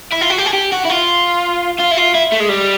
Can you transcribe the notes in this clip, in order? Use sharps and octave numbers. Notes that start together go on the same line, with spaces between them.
E4
F4
F#4
G4
G#4
G4
F#4
E4
F4
F4
E4
F4
E4
A3
G#3
G3